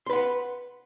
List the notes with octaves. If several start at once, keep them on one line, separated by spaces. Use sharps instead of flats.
B4 F#5 B5 C6